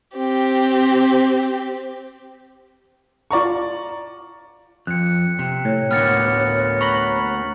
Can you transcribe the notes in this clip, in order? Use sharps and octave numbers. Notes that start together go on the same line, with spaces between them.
C4 G4
F4 D5 A#5 C#6
F2 F#6 C#7
C3
A2 C#5
D2 A#3 B3 F6 A6 C#7
A#5 B5 C#6 F#6